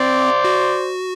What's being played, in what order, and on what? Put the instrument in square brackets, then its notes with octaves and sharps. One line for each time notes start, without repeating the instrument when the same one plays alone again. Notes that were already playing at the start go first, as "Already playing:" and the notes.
Already playing: [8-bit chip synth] C4 [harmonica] C5 D5
[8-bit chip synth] F#4